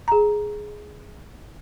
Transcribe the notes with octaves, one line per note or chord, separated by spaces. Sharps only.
G#4 A#5